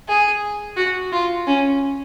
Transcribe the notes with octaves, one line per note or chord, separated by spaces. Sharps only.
G#4
F#4
F4
C#4